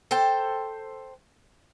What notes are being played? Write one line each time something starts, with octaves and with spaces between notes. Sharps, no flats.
A4 C5 G5